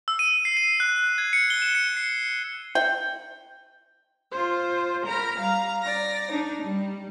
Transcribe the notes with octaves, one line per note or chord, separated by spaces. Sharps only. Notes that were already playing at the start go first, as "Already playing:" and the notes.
E6
D#7
C7
D#7
F#6
G#6
C#7
G7
E7
C#7
C7
G5
F4 C5
A#4 A#5 B5 F6
G3 F5 A#5
D5 A#6
D4 D#4
G3